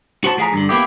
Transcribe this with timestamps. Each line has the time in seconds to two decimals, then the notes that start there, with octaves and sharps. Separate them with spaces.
0.24 F#4 C5 A5
0.37 A2 F3 G#4 F5 G#5 A#5
0.53 G2 D3
0.69 A#3 B3 E4 G4